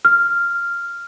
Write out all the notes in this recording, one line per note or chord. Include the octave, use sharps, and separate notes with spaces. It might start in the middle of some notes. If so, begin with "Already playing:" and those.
F6